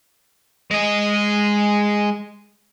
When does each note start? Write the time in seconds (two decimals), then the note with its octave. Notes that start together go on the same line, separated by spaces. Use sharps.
0.71 G#3 D#5